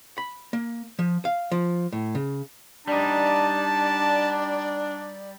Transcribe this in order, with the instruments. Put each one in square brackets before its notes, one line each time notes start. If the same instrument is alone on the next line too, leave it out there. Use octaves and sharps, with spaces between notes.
[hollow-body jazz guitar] B5
A#3
F3
F5
F3
A2
C#3
[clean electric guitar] G3 D#4 [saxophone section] D4 [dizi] D5 [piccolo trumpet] A5